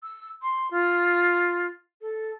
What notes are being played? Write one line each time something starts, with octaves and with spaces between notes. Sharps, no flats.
E6
C6
F4
A4